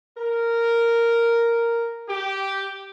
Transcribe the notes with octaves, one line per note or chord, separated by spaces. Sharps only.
A#4
G4